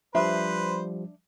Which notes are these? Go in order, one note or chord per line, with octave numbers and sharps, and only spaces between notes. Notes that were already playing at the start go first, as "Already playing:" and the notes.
F3 G3 D4 B4 C5 E5